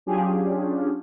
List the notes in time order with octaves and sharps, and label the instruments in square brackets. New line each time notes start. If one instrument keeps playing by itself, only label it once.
[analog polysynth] F#3 C#4 D4 F4 G4 G#4